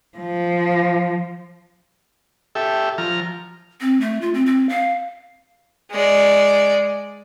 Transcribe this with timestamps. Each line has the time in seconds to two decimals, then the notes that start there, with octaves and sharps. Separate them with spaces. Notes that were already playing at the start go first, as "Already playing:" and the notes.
0.18 F3
2.55 G4 A4 E5
2.98 F3 A#5 F6
3.81 C4
4.01 A3
4.21 F4
4.34 C4
4.46 C4
4.69 F5
5.92 G#3 D5